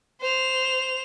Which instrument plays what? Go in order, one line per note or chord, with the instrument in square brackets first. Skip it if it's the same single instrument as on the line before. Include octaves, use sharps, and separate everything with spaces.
[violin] C5 F7